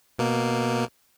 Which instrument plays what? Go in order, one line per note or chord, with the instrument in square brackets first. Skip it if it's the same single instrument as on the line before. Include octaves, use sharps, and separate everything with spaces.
[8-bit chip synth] B2 A#3